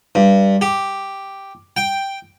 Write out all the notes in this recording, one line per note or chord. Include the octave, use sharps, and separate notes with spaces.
G2
G4
G5